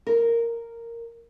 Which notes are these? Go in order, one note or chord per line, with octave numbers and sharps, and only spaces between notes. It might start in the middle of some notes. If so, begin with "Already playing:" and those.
A#4